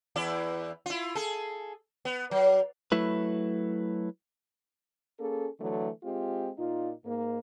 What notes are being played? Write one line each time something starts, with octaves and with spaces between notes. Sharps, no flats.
E2 E4 D5
E4 F4
G#4 A4
B3
F#3
F#3 A3 E4 B4
A#3 C#4 G#4 A4
D3 E3 F#3 A3
G#3 C4 F4 G4
A#2 D#4 F4
G#2 A#3